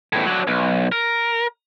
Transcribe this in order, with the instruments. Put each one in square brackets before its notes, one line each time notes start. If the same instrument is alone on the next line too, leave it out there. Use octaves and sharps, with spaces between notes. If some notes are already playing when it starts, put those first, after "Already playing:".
[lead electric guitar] E2 A2
F#3 D4
B1
A#4